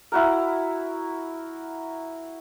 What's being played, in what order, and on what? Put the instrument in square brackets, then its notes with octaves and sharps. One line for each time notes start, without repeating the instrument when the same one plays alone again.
[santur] E4 F#4 A#4